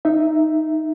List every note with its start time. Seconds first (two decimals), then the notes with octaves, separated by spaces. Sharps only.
0.05 D#4 E5